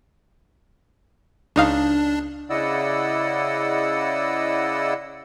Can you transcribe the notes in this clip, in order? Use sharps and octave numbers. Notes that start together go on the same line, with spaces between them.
C#2 D4 D#4 F5
C#3 E4 D5 D#5 F#5 E6